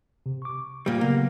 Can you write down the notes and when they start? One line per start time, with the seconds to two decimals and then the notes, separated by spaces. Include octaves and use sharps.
0.26 C3
0.42 C#6 D6
0.86 A#2 G3
1.01 C#3 F#3 A#3 B3